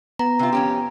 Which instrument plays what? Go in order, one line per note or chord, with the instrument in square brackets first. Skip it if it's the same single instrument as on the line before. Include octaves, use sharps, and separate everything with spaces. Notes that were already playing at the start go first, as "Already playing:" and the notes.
[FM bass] B3 [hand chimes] A#5
[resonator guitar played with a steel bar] C3 F4
F2 C#4 G4